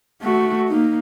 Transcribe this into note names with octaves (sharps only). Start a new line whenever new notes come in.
A3 F#4
A#3 D#4